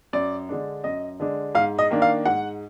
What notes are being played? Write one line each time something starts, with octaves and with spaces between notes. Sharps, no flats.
F#2 D5
D3 G#3 D4
F#2 D#5
D3 G#3 D4
G#2 F5
D#5
D#3 A#3 D4
F5
G#2 F#5